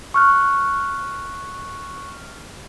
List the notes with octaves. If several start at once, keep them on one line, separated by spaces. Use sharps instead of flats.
C#6 F6 F#6